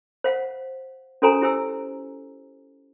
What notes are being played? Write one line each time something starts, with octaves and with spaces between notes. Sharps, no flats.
C5 F5 F#5
C#4 F#4 A4 C5 G#5 A#5
E4 G4 C5 G#5 E6